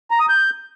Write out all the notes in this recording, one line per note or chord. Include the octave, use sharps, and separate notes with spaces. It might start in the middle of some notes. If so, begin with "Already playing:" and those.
A#5
D#6
G6